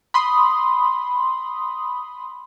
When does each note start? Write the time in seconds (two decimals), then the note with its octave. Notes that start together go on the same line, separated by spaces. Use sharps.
0.14 B5 C6 D#6